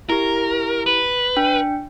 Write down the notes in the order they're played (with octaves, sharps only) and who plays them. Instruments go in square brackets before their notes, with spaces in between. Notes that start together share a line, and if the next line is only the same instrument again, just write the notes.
[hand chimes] E4 G4 [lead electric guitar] A#4
[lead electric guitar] B4
[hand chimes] D4 G5